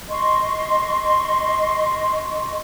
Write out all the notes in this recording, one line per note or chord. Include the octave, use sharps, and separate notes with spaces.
D#5 C6 C#6